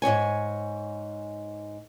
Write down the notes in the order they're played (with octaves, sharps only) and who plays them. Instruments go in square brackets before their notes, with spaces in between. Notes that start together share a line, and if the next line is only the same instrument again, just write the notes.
[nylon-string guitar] G#2 C#3 C#5 G#5